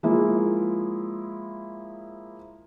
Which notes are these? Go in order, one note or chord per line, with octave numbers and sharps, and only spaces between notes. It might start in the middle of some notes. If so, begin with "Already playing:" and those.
F3 G#3 A#3 E4